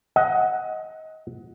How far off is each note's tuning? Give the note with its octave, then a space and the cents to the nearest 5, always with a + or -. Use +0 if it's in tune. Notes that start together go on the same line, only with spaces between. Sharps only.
D#5 +25 F#5 +0